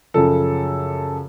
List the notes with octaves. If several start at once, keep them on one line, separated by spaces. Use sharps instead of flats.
F#2 C#3 F3 A4